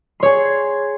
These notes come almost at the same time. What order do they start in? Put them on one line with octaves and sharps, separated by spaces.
C6 C#5 G#4